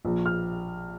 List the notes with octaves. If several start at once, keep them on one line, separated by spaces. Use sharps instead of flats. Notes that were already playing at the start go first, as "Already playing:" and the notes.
A#1
F6